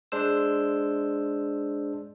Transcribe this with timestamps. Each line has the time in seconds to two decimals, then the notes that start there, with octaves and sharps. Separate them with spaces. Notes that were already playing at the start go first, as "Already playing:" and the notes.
0.12 G#3 D4 C5 E6